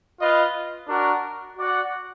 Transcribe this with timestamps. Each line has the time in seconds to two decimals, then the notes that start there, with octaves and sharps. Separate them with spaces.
0.20 F4 B4 D#5
0.88 D4 F#4 A#4
1.57 F#4 D5 F#5